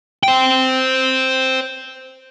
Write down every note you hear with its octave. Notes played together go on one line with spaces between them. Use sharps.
C5 G5